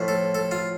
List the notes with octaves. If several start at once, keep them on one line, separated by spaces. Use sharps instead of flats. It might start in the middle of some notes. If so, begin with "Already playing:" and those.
Already playing: A2 F3
A4
A4
F4